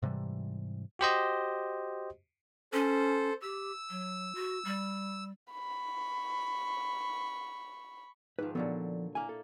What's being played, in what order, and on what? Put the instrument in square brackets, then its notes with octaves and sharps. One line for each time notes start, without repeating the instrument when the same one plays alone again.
[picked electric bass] G#2 C3 E3 G3
[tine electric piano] F#4 G4 C5 D#5
[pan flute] C#4 [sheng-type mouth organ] A4 C5
[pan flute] G4 [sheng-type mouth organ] E6
[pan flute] F#3
F#4
G3
[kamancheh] B5 C#6
[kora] G#2 D#3 F3 [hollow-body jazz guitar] B4
[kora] A#2 D3 F#3 [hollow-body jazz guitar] F3 B3 A4
[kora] A#3 E4 [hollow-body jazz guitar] G#5
[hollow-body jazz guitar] A4